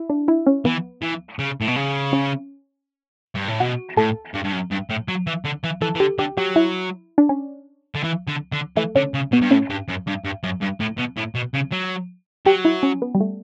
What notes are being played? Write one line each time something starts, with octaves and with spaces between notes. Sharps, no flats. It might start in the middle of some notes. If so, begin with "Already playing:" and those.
Already playing: E4
D4
E4
C#4
E3 B3
E3
C#3
A2
B2
C#3
C#4
G2
A2
B2 F#4
A2 A4
G2
G2
F#2
G2
A2
F#3
E3
D3
E3
E3 A4
E3
D3 G4
D3 G4
F#3 G4
E4
D4
C#4
D3
E3
D3
D3
E3 A3
D3 C#4
C#3
B2 B3
G2
A2 C#4
G2
F#2
G2
G2
F#2
G2
A2
B2
A2
B2
C#3
F#3
F#3 G4
E4
C#4
B3
G3
A3